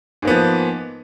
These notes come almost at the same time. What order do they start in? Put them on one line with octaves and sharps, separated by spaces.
G#2 A#3 B3 F3